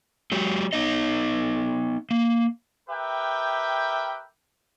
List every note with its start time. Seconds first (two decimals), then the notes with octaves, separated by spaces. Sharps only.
0.32 F#3 G#3 G4
0.73 B3 D#4 D#5
2.11 A#3
2.89 G4 A#4 B4 E5 G5